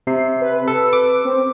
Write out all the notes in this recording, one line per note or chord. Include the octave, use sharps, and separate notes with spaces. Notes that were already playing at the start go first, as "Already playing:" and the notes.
C3 C7
B4
A4
D6
C4